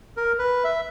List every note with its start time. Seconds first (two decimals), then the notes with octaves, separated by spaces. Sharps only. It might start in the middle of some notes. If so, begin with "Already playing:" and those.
0.17 A#4
0.39 B4
0.64 E5